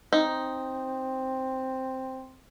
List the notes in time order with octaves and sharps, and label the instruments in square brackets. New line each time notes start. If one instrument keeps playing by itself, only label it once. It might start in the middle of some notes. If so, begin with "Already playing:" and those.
[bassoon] C4 [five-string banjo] D#4